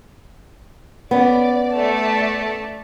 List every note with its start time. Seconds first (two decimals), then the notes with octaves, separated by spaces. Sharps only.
1.11 B3 C#4 D5
1.72 A3 D5 A5